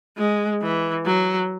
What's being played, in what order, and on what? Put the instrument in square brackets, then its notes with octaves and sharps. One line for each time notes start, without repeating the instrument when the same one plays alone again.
[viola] G#3
E3
F#3